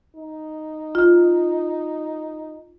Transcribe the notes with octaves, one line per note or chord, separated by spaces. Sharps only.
D#4
F4